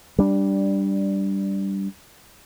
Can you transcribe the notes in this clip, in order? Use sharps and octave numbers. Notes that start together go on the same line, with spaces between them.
G3 D4